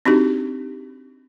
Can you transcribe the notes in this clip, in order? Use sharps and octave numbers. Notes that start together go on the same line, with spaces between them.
C4 D4 D#4 F#4 G4